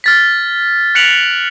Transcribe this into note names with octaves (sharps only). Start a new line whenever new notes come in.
F6 A6 B6
F#6 B6 C#7 D7 F7 F#7